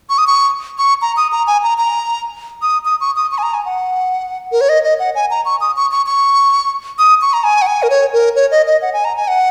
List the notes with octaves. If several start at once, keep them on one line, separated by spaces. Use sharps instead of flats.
C#6
D#6
C#6
C#6
A#5
D#6
A#5
G#5
A#5
A#5
D#6
D#6
C#6
D#6
C#6
G#5
A#5
G#5
F#5
A#4
C#5
D#5
D#5
F#5
G#5
A#5
C#6
D#6
C#6
C#6
C#6
D#6
C#6
A#5
G#5
F#5
G#5
A#4
C#5
A#4
C#5
D#5
D#5
F#5
G#5
A#5
G#5
F#5